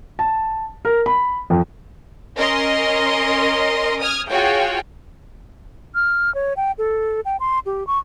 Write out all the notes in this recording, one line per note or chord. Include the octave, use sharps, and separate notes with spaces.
A5
A#4
B5
F2
C#4 A#4 D#5 C6
D#6 F6 G#6
F4 F#4 G#4 C#5 G5
F6
C#5
G5
A4
G5
C6
G4
C#6